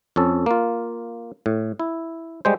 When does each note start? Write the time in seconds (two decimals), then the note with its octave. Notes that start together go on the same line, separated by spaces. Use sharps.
0.16 F2 C#4 A4
0.46 A#3 F4
1.46 A2
1.80 E4
2.45 G3 G#3 C5